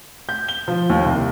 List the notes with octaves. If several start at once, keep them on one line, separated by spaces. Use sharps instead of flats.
G6
G7
F3
D#2
C2